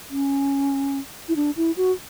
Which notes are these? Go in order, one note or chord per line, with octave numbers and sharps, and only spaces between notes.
C#4
E4
D4
E4
F#4